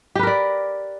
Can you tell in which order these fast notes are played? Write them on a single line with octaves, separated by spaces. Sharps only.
G4 B4 A#4 D5